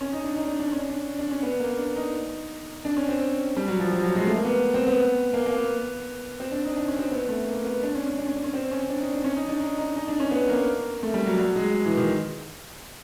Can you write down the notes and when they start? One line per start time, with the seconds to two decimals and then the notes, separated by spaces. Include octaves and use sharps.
0.01 C#4
0.13 D#4
0.24 D4
0.36 D#4
0.47 D4
0.59 D4
0.72 C#4
0.89 D4
1.19 D4
1.31 C#4
1.43 B3
1.60 A#3
1.78 D4
1.96 D#4
2.85 D4
2.97 C#4
3.09 C4
3.57 G3
3.68 F#3
3.80 F3
3.92 F3
4.03 F#3
4.15 G#3
4.27 A3
4.36 A#3
4.45 B3
4.74 C4
4.87 B3
5.33 A#3
5.46 A#3
5.57 B3
6.40 C4
6.52 D4
6.65 D#4
6.76 D4
6.88 C#4
6.99 C4
7.11 B3
7.29 A3
7.47 A#3
7.65 B3
7.83 D4
7.95 C#4
8.06 C#4
8.18 D4
8.27 C#4
8.36 D4
8.44 C#4
8.54 C4
8.71 C#4
8.89 D4
9.01 D#4
9.13 D4
9.24 C#4
9.36 D#4
9.49 D4
9.60 D#4
9.78 D#4
9.96 D#4
10.08 D4
10.20 C#4
10.31 B3
10.49 A#3
11.03 A3
11.14 G3
11.26 F#3
11.38 F#3
11.56 G#3
11.86 E3
11.97 D#3